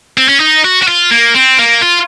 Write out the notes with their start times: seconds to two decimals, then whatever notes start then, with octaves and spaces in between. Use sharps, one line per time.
0.18 C4
0.29 C#4
0.40 D#4
0.64 F#4
0.83 F#4
0.88 F4
1.11 A#3
1.35 C4
1.59 A#3
1.82 F4